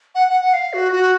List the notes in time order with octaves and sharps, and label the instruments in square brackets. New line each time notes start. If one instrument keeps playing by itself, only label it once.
[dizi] F#5
F#5
F#5
F5
F#4
F#4